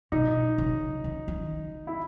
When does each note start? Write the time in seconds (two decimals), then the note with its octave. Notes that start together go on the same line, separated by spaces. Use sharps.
0.12 B2 D#4
0.58 C#3
1.04 C#3
1.28 D#3
1.87 E4